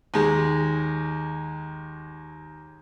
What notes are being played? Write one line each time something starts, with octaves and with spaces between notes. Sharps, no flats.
D#2 G#3